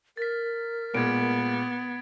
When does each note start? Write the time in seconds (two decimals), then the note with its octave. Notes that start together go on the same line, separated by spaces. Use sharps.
0.17 A#4 A6 B6
0.95 A#2 G#3 B3 G#6 D7